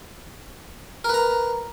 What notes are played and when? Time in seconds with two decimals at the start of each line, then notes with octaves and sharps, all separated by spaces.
1.04 A#4
1.09 B4
1.14 A#5